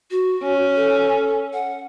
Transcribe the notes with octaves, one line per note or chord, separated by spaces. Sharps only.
F#4
C#4
A4
F#5